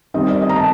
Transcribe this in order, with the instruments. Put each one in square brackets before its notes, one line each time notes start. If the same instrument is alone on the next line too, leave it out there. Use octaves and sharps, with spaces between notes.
[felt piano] D#3 G3 C4 D#4 D#5
D5
D#5
A#5
A5